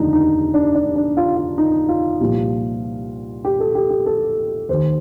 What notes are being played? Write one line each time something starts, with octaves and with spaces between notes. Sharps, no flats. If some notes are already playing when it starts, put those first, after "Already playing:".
Already playing: F1 D#2 D3 F3 D4 D#4
D#4
D4
D4
D4
F4
F4
D#4
F4
C2 A#2 F3
G4
A4
G4
G4
A4
D#2 D#3 C5